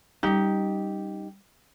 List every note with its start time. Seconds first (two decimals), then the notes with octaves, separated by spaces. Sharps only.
0.23 G3 C#4 D#4 G4